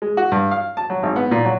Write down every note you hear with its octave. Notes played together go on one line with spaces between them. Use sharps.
G#3
F#4
G2
F5
A5
F#3
G#1
B3
A#2
F#3